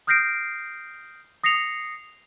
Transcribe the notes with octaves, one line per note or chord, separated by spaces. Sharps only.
D#6 F6 G6 A#6 C7 D7
D#6 A#6 C7 C#7 F7